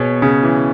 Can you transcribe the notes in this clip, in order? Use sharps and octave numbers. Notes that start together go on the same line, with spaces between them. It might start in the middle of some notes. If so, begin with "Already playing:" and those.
Already playing: B2 B3 G#4 C#5
C#3
E3